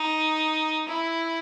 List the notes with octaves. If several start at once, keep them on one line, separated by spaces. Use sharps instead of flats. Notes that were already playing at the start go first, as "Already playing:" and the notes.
Already playing: D#4
E4